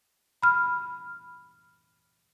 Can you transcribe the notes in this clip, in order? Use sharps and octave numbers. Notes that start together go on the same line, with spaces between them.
B5 F6